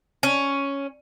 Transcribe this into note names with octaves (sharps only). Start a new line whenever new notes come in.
C#4